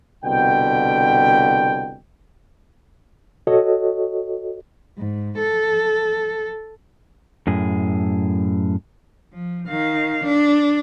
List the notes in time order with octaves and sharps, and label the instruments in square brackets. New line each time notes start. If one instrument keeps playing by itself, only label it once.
[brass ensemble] C2 B2 D3 G5
[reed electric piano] F#4 A4 C#5 D#5
[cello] G#2
A4
[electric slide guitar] F#2 A2 G#4
[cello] F3
D#3 F5
D4